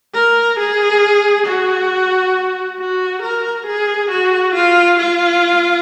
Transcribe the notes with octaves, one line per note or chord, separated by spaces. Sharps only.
A#4
G#4
F#4
F#4
A#4
G#4
F#4
F4
F4